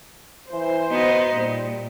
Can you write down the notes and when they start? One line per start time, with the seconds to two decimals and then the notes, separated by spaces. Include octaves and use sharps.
0.52 E3 C5
0.91 B3 D#4 F#4 D#5
1.36 A#2 G3